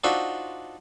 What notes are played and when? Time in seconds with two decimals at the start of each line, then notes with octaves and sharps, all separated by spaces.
0.04 D4 D#4 F4 F#4 C5 E5